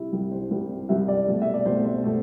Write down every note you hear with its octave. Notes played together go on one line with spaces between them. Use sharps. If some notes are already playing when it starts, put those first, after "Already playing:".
Already playing: C2 C3 G3 E4
C2 C3 G3
C5
C2 C3 G3
C2 C3 G3 E5
D5
C2 B2 A3
E5
D5
C2 B2 A3 C5
C5
B2 A3